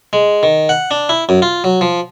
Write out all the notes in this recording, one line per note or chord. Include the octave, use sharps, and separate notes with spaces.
G#3
D#3
F#5
D4
E4
F#2
F4
F#3
F3